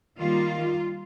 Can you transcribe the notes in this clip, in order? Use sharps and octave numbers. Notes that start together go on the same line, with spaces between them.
D#3 G3 A#3 F4